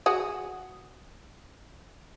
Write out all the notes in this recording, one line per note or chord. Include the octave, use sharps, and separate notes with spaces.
F#4 G#4